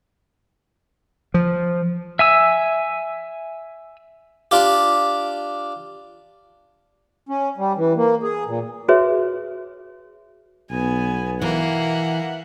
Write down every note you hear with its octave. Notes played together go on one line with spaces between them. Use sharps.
F3
E5 G#5 E6
D4 F4 G4
C#4
G3
E3
A#3
G#4
A#2
F#4 G#4 B4 C#5 E5
B1 B3 G#5
E3 A#3 E5 F#5